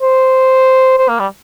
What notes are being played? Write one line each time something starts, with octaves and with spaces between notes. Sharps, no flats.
C5
C5
A#3
G3